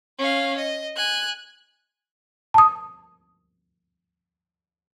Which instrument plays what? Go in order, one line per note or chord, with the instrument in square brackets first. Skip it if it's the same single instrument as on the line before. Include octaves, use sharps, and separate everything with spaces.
[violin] C#4 F5
D#5
G#5 F#6
[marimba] A5 D#6